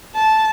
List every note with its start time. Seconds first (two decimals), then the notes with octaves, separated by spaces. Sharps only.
0.15 A5